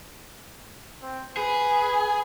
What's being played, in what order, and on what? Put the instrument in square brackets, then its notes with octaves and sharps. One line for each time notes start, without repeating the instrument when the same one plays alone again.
[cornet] C4
[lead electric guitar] G#4 [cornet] B4